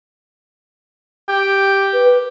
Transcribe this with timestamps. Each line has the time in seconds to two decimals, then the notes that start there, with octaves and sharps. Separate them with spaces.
1.28 G4
1.93 B4